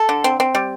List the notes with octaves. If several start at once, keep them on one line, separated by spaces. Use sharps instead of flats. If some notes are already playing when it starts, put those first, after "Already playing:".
Already playing: A4
D3
C4
C4
G3